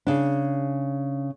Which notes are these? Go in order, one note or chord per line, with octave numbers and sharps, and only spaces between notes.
C#3 D4